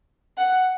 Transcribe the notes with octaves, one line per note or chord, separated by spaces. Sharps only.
F#5